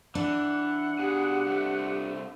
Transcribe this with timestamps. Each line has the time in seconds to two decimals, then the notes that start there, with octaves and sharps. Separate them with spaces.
0.15 E3 D4 F#5
0.99 B2 G4 G#4
1.45 C2 A3